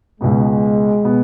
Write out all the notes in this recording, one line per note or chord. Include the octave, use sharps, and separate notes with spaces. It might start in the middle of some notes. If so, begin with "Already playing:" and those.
C#2 B2 G#3 B3
B2 B3